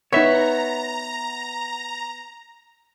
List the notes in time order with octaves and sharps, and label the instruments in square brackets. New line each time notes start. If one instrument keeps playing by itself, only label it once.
[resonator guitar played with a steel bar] B3 [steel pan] D#4 B4 C#6 [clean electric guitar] C#5 E5 [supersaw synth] A#5